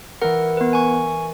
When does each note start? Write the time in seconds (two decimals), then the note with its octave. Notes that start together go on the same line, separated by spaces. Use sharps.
0.22 E3 A#4 F#5
0.57 B3 B4
0.73 G#5 C#6